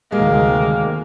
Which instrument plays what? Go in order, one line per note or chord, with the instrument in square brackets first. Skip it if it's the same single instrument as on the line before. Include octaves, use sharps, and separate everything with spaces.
[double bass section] D2 C3 D#3 [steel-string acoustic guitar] G#3 [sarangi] A#3